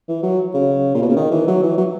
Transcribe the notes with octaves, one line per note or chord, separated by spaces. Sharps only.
E3
F#3
C#3
A#2
B2
C#3
D#3
E3
F#3
E3
F#3